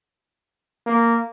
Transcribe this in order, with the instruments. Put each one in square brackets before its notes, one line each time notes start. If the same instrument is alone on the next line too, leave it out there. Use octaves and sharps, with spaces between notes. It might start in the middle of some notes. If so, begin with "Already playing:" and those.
[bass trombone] A#3